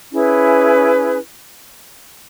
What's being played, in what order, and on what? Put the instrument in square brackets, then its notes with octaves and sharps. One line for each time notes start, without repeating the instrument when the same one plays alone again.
[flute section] C#4 E4 G#4 B4